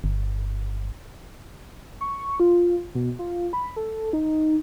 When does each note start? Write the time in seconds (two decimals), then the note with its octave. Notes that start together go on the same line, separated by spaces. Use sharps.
0.04 G1
2.01 C#6
2.40 F4
2.95 B2
3.19 F4
3.53 B5
3.76 A4
4.13 D#4